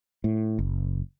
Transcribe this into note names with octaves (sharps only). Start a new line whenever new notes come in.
A2
F#1